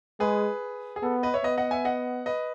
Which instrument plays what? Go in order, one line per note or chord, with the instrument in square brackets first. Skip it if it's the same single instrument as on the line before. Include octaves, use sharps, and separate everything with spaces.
[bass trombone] G#3 [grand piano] G#4 B4
[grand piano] G#4
[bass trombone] B3 [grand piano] A4
[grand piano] B4 D#5
C#5 E5
[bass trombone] B3 [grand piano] B4 D#5
[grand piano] D#5 F#5
E5 G#5
D#5 F#5
B4 D#5